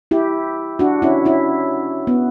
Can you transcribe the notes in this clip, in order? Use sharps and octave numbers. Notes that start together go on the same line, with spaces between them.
E4 G4
D4 F#4
C#4 E4
C#4 E4
B3